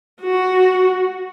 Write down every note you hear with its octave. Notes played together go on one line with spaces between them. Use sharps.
F#4